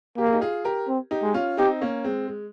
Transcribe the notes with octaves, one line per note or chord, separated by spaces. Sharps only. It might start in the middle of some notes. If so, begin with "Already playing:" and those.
A#3 G4
G#4
D#4 G4
F4 G#4
G4 A#4
C4
D#4 G4
G#3
C#4 F4
C4 D#4 G4
A#3 C#4
G#3 C4
G#3